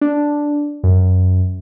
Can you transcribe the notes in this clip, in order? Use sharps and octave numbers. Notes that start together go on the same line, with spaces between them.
D4
F#2